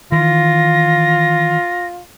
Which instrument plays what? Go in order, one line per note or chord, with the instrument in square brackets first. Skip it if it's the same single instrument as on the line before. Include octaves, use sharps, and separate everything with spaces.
[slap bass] D#3 E3 [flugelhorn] F4 [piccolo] A#6